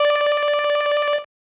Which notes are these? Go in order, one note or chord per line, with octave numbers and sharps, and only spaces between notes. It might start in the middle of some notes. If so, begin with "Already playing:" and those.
Already playing: D5